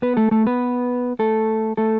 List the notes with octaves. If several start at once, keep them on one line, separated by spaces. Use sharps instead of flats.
B3 B4
A3 A4
A3 A4
B3 B4
A3 A4
A3 A4